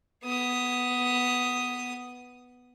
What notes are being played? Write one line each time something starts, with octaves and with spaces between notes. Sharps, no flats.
B3 D#6